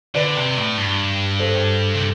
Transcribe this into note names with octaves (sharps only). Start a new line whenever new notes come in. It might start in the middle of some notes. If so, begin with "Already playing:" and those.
D3 B4 D5
C3
A2
G2
A4 C5
C3